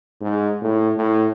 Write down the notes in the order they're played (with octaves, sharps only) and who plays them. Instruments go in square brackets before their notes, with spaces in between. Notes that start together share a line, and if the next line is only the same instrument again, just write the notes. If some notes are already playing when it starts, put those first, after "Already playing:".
[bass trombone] G#2
A2
A2